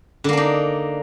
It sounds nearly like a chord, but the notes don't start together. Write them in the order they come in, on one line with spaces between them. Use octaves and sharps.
D3 A#3 D4 D#4